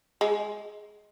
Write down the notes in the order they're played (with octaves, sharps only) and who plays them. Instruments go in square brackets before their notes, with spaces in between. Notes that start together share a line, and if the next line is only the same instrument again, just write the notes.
[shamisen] G#3